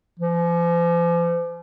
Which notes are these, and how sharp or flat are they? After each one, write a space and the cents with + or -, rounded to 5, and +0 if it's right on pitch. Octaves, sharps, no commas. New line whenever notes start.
F3 -40